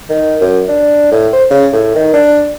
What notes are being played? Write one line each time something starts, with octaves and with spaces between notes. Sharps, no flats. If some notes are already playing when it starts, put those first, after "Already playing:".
D#3
F#2
D4
A2
C5
C#3
A2
D#3
D4